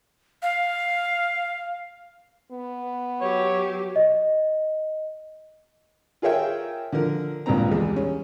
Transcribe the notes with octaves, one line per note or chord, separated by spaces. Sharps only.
F5
B3
F#3 G4 C#5
D#5
F4 G#4 A#4 C#5 E5 G5
D3 F3 A#4
C#2 G2 A#2 C4 A#5
E2 G3 G#3
C#4